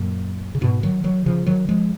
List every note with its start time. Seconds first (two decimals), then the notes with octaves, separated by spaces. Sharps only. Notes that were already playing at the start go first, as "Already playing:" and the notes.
Already playing: F#2 A#2
0.55 C#3
0.61 G#2 B2
0.83 D#3 F#3
1.04 D#3 F#3
1.26 C#3 F3
1.46 D#3 F#3
1.69 F3 G#3